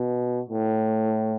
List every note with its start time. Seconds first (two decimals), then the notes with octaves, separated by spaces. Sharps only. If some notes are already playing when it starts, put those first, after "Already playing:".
Already playing: B2
0.50 A2